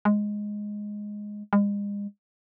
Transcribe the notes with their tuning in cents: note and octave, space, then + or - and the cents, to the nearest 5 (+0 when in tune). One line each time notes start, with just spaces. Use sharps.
G#3 +0
G#3 -40